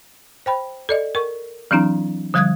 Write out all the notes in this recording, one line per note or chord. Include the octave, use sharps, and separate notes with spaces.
C5 G5 B5
A4 D5 D#5
A#4 C#6
E3 F#3 C4 D4 E4 A#5
D3 F3 G3 D#6 F#6 G#6